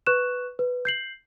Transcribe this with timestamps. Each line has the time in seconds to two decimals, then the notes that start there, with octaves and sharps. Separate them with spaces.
0.07 B4 C#6 F#6 E7
0.59 B4
0.85 G6 C7 F#7